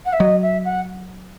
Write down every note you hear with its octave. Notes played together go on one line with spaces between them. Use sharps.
F#5
E5
F#3 D#5
E5
F#5